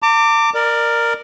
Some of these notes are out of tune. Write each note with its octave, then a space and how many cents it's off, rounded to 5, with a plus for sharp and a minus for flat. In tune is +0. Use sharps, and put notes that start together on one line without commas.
A#5 -45 D6 +0
A#4 +0 D5 +20